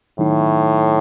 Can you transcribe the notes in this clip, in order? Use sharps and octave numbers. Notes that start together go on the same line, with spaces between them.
A2 D#3 F#3 B3 D#4